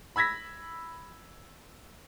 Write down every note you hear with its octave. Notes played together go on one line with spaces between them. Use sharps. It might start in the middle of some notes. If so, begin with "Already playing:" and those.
B5 E6 G#6 A#6 B6